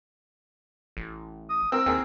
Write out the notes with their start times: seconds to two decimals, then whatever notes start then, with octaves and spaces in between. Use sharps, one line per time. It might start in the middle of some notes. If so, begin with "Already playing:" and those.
0.97 A1
1.50 D#6
1.72 C4 A#4 E6
1.86 D#2 C4 G#4 A#4